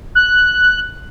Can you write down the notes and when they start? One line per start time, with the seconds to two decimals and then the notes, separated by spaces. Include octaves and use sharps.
0.15 F#6